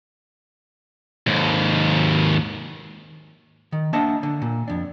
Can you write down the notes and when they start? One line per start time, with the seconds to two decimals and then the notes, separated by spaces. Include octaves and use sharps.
1.27 D#2 G#2
3.72 D#3
3.93 A#3 D4 D#5 E5 F#5 A5
4.23 D3
4.42 A#2
4.68 F2 D4